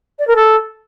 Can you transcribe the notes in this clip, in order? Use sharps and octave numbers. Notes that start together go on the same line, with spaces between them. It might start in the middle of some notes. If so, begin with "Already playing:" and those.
D5
A#4
A4